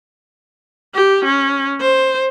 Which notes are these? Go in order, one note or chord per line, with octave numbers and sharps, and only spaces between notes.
G4
C#4
C5